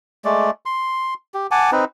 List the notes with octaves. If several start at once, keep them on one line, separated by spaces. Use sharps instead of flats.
G#3 A3 D5
C6
G4
F#5 G#5 A5 D6
C4 D#4 B4